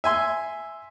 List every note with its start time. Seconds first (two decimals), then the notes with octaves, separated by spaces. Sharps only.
0.04 E5 G#5 C6